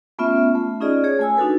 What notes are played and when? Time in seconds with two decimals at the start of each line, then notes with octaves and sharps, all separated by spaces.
0.19 A3 B3 C#4 F4 E5
0.55 A3
0.80 C#4 D#4 F4 G#4 D5 D#5
1.04 G#4 C#5
1.19 A3 G#5 E6
1.37 D4 D#4 F#4 A4 B4